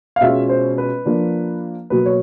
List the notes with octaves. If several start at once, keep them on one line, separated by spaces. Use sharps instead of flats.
F5
B2 G#3 C#4 F4 E5
C5
B4
F3 A#3 D4 F4
B2 F#3 A#3 B4
C#5